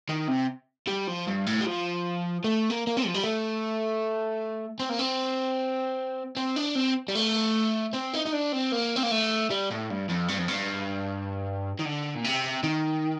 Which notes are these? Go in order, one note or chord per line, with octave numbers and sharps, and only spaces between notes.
D#3
C3
G3
F3
G2
A2
G3
F3
A3
A#3
A#3
C4
F3
G3
A3
C4
A#3
C4
C4
D4
C4
G3
A3
C4
D#4
D#4
D4
C4
A#3
C4
A#3
A3
G3
A2
G2
F2
G2
F2
G2
D#3
D3
A#2
C3
D#3